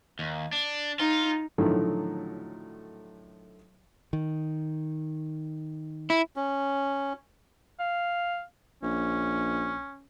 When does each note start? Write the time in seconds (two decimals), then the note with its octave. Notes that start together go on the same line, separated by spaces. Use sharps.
0.19 D#2
0.53 D4
1.00 D#4 F4
1.58 A2 D3 D#3 F3 F#3 A3
4.13 D#3
6.10 E4
6.36 C#4
7.80 F5
8.83 A#1 C#4